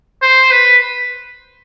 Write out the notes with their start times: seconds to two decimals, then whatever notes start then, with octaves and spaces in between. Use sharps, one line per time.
0.22 C5
0.51 B4